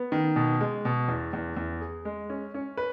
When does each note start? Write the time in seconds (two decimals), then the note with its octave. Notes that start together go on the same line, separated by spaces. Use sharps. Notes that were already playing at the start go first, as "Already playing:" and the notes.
Already playing: B3
0.12 D#3
0.36 B2
0.61 G#3
0.85 B2
1.08 E2
1.33 E2
1.57 E2
1.81 G#4
2.05 G#3
2.30 C#4
2.54 C#4
2.77 B4